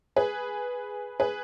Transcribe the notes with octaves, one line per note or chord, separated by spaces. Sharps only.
G#4 B4
G#4 B4